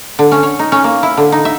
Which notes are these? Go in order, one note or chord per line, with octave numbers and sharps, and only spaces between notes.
D3
C#4
C#5
D#4
C#4
A#3
E4
D3
D#4
E5